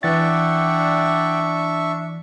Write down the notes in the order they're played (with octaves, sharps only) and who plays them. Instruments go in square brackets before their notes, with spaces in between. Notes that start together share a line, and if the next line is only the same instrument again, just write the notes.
[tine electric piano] E3 A6 [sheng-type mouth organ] D4 E5 C#6 [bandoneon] D5 F#5 G5